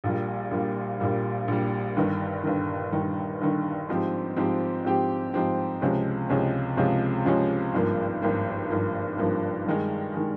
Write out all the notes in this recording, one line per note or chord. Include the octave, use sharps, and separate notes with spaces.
A#1 A#2 G3
A#1 A#2 G3
A#1 A#2 G3
A#1 A#2 G3
G1 G2 D#3
G1 G2 D#3
G1 G2 D#3
G1 G2 D#3
G#2 F3 C4 G4
G#2 F3 C4 G4
G#2 F3 C4 G4
G#2 F3 C4 G4
C#2 C3 F3 G#3 C#4
C#2 C3 F3 G#3 C#4
C#2 C3 F3 G#3 C#4
C#2 C3 F3 G#3 C#4
G#1 G2 F3 A#3
G#1 G2 F3 A#3
G#1 G2 F3 A#3
G#1 G2 F3 A#3
G2 D#3 G#3
D#3 G#3